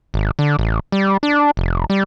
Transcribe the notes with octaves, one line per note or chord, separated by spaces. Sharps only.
G#1
D3
A1
G3
D4
F1
G3